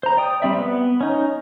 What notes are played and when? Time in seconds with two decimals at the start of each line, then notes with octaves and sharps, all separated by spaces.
0.03 C5 A#5
0.17 D5 G5 D#6
0.42 G3 C4 D5 E5
0.58 B3
1.01 C#4 D#4